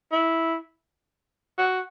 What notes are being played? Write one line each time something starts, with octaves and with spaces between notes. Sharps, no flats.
E4
F#4